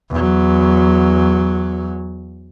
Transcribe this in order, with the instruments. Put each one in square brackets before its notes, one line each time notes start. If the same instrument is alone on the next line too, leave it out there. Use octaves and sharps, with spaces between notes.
[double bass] E2 F#3